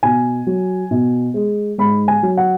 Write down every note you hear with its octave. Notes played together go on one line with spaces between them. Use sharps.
B2 G#5
F#3
B2
G#3
G#2 B5
G#5
F#3
F#5